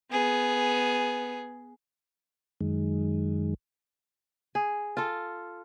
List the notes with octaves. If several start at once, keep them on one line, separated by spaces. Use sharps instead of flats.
B3 G#4
F#2 D#3 G#3
G#4
F4 A4